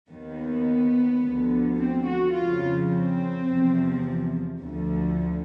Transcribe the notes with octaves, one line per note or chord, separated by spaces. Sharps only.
D#2 D#3 B3
D2 D3 F3
C4
F#4
F2 C#3 F3 F4
C4
E2 C3 F3
D2 D3 F3